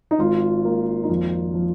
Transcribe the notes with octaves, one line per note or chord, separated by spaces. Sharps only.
D#4
G#1 F4
A#3
D#4
F2 F4
F3